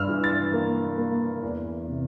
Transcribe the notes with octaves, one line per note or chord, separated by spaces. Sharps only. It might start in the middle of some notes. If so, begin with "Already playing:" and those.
Already playing: G2 E6 F6
E3
A6
A#3
A#3
E2
C3